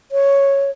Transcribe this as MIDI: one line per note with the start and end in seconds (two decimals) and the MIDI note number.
0.12 0.71 73